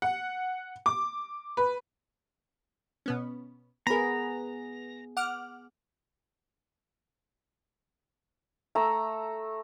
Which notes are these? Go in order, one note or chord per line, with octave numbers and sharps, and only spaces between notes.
F#5
D6
B4
B2 B3 C#4
B3 G#4 A#4 A#5 B5
F#5 D6 F6
A3 A#5 E6